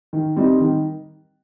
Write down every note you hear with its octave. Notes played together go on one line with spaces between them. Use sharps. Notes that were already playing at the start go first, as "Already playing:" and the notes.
D#3
G3 C4 D#4
D#3